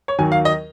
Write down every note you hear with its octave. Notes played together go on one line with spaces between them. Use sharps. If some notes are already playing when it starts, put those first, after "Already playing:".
C#5
D#2 D#3 F#3 G#5
F5
D#5